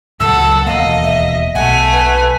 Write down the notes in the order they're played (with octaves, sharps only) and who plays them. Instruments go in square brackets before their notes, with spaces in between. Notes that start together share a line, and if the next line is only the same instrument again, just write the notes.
[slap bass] C#2 A#2 F#3 [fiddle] A4 F#5 [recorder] E6
[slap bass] E1 D#2 A#3 [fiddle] D#5 [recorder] F5
[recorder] E5
[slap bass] B1 B2 [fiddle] A3 G#5 [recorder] F#5
[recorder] B4